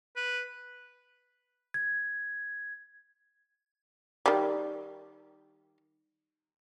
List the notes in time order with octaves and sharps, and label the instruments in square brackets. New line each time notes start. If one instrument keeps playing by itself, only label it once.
[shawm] B4
[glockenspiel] G#6
[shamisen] D#3 G3